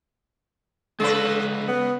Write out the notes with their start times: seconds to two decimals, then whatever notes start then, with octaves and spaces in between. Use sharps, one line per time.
1.00 C#3 G#3 A4 B4 D5 F5
1.68 B3